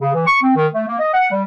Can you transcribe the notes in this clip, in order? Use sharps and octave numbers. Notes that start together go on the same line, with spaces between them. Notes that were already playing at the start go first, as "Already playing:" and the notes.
C#3
E3
C#6
C4
D#3
A3
A#3
D#5
F#5
G3